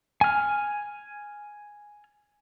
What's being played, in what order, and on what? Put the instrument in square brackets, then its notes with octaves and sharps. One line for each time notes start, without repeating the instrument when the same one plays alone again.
[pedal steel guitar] G#5 F6